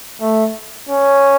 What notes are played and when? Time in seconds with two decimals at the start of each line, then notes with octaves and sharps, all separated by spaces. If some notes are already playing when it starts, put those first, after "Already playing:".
0.21 A3
0.89 C#4